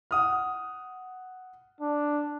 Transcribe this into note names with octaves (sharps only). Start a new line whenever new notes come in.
F#5 D#6 F6
D4